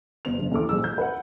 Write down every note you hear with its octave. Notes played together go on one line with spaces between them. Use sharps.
G1 F7
F#1 D3
D#2 E3 A4 D6
A#1 G#3 E6
G6
B4 F#5